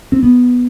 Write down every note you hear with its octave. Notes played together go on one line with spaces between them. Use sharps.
C4
B3